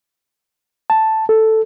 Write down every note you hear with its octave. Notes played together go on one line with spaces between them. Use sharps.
A5
A4